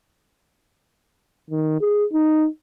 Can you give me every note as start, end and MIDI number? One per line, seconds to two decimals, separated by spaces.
1.50 1.80 51
1.81 2.05 68
2.13 2.47 63